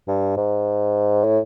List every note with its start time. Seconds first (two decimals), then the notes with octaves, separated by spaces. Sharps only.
0.08 G2
0.37 G#2
1.24 A2